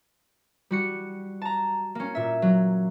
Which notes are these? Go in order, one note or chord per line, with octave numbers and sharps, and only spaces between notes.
G3 F#4 C#7
A5 A#5
A#3 C#4
A#2 E5
F#3